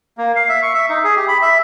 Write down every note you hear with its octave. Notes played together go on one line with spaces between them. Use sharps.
A#3
F5
E5
C#6
E5
D#4
G#4
G4
B5
E5